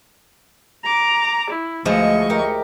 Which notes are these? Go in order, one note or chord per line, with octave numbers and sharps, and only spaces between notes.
A#5 D6
E4
D2 F3 G#3 E4 D#5 C#6
G4 A#4